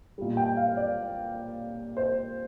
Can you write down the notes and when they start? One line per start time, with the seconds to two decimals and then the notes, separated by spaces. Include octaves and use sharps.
0.18 A#2 G3
0.37 G5
0.57 F5
0.77 D5
1.97 C5